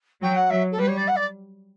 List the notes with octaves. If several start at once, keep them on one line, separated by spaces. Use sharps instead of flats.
F#3 G5
F#5
F#3 E5
A4
G3 B4
C#5
D5
F#5
D5